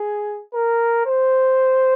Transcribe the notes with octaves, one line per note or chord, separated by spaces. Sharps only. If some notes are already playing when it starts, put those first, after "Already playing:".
Already playing: G#4
A#4
C5